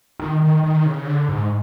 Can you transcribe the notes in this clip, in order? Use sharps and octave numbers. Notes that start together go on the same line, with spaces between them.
D#3
D#3
D#3
C#3
D3
G#2